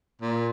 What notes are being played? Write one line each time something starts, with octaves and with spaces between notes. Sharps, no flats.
A#2